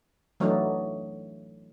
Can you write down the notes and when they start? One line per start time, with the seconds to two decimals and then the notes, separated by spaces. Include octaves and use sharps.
0.40 E3 F#3 A3 D4 D#4